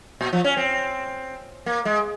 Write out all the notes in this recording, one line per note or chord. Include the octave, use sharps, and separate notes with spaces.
A#2
F3
C#4
C4
A#3
G#3